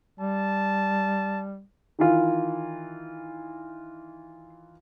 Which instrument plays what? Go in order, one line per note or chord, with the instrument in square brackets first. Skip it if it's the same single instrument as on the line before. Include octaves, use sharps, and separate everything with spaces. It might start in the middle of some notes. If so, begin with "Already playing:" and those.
[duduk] G3 [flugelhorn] A5
[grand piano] D#3 E3 F4